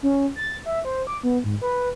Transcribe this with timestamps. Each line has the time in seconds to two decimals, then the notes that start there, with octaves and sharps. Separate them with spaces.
0.03 C#4
0.36 A6
0.66 E5
0.85 C5
1.07 D6
1.23 B3
1.44 G#2
1.62 B4